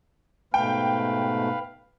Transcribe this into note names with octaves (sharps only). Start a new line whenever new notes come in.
G#2 B2 A3 B4 F5 G5